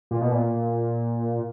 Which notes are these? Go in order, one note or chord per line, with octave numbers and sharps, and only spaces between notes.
A#2
B2
A#2